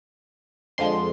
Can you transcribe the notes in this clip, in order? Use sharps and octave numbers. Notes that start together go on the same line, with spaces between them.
F2 D3 F3 G#3 C6